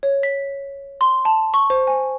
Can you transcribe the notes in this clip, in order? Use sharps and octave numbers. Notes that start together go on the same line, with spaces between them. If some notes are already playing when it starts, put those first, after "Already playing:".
C#5
B6
C6
A5
C#6
C5
G#5